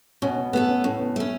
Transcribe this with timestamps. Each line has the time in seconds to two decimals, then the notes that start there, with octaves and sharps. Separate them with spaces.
0.22 B2 C#4
0.37 B3
0.53 A3 B3 F#4 A4
0.69 C#4
0.84 A2 C#4
1.00 B3
1.16 A3 B3
1.20 C#4